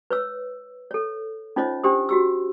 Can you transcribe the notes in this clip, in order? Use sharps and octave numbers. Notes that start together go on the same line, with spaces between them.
B4 C#5 E6
A4 C#5
C#4 D#4 F4 C5 C#5 D#5
C#4 D4 G4 C5 D#6
F#4 G4 E6